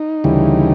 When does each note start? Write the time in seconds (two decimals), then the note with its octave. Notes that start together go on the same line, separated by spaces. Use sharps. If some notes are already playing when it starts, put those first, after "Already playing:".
Already playing: D#4
0.24 D2 C#3 E3 G3